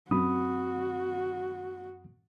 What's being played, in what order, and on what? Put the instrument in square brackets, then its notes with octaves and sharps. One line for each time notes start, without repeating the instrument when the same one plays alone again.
[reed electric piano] F#2 B5 D#6 [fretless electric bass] C4 D4 [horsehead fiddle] F#4